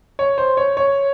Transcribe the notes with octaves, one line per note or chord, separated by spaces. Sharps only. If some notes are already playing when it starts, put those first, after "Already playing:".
C#5
C5
C#5
C#5